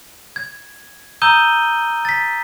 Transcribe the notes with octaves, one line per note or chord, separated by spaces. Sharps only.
G#6
A#5 D#6 E6 G6 D#7 G7
A6 B6